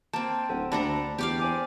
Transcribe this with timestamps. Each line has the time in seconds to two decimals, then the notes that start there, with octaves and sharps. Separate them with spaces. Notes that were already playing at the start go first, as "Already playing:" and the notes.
0.13 A#3 C4 A5
0.50 D1 A4 C5 F#5
0.72 D2 D4 A4 A#5 B5
1.18 E2 G4 D5 F5
1.39 C5 G#5 D6